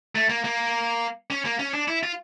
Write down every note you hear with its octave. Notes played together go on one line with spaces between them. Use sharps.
A3
A#3
A#3
C#4
A#3
C#4
D4
E4
F4